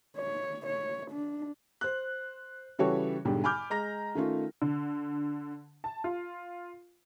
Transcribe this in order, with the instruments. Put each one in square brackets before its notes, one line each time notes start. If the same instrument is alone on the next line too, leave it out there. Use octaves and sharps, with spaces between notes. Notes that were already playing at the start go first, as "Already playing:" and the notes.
[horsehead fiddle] C#5
C#5
D4
[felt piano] C5 F#6
C#3 E3 G3 F#4 A4 C#5
B1 G#2 D3 G3
G#5 B5 D6 F6 G6
G#3 A#5 A#6
D#3 A3 C#4 F4
[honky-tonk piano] D3
A5
F4